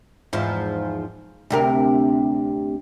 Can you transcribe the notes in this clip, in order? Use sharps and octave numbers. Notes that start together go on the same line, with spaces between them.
E2 G#2 F3
D2 C3 A#4